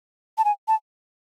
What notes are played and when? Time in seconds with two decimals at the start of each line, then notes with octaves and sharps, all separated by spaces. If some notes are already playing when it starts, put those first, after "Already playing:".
0.38 A5
0.45 G#5
0.68 A5